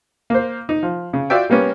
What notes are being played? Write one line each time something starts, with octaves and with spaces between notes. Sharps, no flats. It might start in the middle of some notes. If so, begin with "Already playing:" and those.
A#3 C5
D#4
F3
C#3
F4 F#4 D5 E5 G5
G3 A#3 B3 C#4